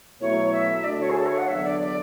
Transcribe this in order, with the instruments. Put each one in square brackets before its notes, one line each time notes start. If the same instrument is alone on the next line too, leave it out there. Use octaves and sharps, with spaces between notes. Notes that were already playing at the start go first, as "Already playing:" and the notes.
[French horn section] B2 F#3 A3 E4 [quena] C#5
[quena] E5
[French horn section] D2 D3 A3 D4 F#4 [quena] D5
[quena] C#5
G#4
A4
C#5
F#5
[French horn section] E2 D3 F#3 B3 D4 [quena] E5
[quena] D5
D5